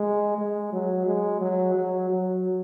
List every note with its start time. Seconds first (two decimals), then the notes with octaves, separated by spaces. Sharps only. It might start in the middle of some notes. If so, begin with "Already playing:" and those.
Already playing: G#3
0.38 G#3
0.73 F#3
1.06 G#3
1.41 F#3
1.75 F#3
2.10 F#3